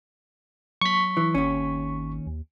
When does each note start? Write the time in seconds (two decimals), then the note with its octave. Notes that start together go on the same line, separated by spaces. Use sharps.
0.81 F#3 C#6 B6
1.17 E3
1.35 G#1 D#2 C#4
2.26 D#2